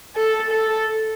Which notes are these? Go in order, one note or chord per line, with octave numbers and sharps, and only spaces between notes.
A4
A4